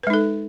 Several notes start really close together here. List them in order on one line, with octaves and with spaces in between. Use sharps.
B4 G#3 D#4 A4